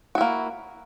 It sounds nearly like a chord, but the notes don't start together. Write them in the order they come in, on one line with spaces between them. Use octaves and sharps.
F#4 E4 A#3